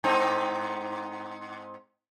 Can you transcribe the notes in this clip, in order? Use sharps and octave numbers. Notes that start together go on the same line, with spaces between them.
G#2 C4 D#4